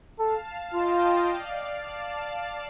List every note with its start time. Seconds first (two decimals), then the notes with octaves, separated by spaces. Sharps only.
0.19 A4 F5 A5
0.73 F4 D#5 G5
1.27 D5 F5
1.82 F5 A5